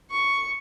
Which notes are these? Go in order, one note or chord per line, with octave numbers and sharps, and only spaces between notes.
C#6